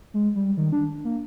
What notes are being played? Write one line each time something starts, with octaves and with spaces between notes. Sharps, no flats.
G#3
G3
D#3
D4
A#3